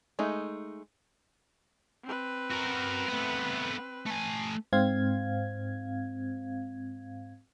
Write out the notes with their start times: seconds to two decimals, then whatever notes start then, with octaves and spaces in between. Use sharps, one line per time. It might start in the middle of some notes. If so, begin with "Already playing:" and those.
0.19 G#3 A3 D#4
2.04 C4 B4
2.51 F#4 A#4
3.08 A3 B3
4.06 A3 G#5
4.73 G#2 C4 F5 G#6